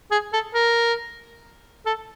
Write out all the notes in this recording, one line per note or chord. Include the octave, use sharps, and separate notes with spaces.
G#4
A4
A#4
A4